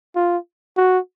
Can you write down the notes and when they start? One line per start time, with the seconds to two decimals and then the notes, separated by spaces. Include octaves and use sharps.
0.16 F4
0.77 F#4